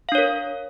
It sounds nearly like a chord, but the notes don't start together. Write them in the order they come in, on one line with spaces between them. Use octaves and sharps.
F5 D4 C#5 A#4